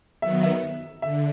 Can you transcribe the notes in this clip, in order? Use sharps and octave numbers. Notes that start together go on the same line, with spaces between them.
D#3 F#3 B3 E5
E5
D3 E5